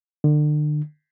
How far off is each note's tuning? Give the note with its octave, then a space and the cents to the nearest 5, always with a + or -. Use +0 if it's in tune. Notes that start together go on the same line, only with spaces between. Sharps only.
D3 +35